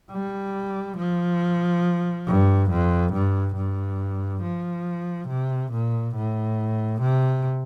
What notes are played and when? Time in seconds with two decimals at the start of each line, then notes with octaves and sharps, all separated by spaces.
0.11 G3
0.97 F3
2.27 G2
2.70 F2
3.13 G2
3.56 G2
4.42 F3
5.28 C3
5.72 A#2
6.16 A2
7.01 C3